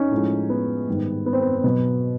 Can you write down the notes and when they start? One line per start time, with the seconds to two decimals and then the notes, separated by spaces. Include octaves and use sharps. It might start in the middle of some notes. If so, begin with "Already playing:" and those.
Already playing: C#4 D#4
0.11 A2 F3 G#3
0.50 B3
0.88 G#2 D#3 G3
1.26 B3
1.33 C4
1.42 B3
1.57 C4
1.64 B2 F#3 B3